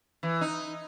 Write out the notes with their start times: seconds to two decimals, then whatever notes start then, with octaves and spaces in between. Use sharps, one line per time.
0.23 E3
0.41 D#4